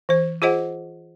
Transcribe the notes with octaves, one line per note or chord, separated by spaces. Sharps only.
E3 C5
F4 G#4 C5 D#5 F#5